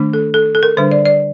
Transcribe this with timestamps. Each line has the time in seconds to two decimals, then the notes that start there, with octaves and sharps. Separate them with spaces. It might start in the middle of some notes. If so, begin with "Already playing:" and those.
Already playing: D#3 A3 D4
0.13 A4
0.34 A4
0.55 A4
0.63 A#4
0.77 D3 G3 D4 C5
0.91 D5
1.05 D5